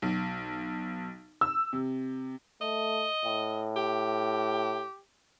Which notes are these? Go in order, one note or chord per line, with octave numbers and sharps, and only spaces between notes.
B1
E6
C3
A3 D#5
A2
G4